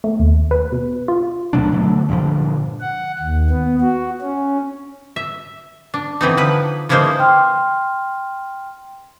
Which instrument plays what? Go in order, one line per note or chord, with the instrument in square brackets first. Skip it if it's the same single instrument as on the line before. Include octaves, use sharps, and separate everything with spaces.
[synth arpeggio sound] A3
D#2
B4
B2
F4
[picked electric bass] D2 B2 F#3 D4
B2 D3 F#3 A3
G2 A#2 D3 F3
[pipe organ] F#5
D#2
B3
F#4
C#4
[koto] E5
D4
D3 E3 C4 D#4
F3 B4
E3 F3 G#3 A#3 D#4 C5
[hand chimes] G5 C6 F6